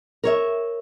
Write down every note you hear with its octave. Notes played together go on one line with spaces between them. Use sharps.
A#4 C#5 E5